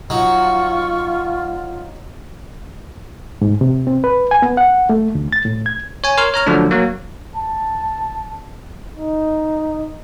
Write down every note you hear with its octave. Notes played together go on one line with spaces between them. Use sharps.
F#3 D#4 F4 C#6
G#2
C3
C4
B4
G#5
B3
F#5
A3
D2
A6
A2
G#6
C#5 G#5
A#4 C#5 C6 F6
C#5 A#5 F6
D3 F3 F#3 A3 D4
F#3 A#3
A5
D#4